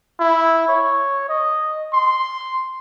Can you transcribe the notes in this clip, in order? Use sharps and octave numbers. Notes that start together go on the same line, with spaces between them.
E4
C#5
D#5
C6